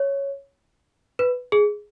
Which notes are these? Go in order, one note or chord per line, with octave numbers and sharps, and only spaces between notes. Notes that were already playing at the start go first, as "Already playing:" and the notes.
Already playing: C#5
B4
G#4